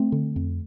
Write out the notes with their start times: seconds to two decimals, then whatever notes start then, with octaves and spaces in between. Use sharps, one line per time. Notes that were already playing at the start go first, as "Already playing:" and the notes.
Already playing: A3 C4
0.12 D3
0.36 F2